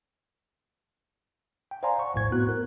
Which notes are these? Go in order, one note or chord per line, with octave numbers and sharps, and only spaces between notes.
G5
C5 D5 F5 G#5 A#5 C6
F#5 C#6
A#1 E2 A2 C5 G#6
A2 B3 C4 F#4 F#6
A#4